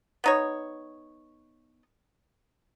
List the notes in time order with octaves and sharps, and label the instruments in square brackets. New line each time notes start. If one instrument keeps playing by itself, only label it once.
[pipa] B3 D#4 C#5